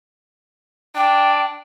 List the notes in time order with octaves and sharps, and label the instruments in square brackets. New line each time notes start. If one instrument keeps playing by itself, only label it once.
[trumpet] D4 [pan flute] G5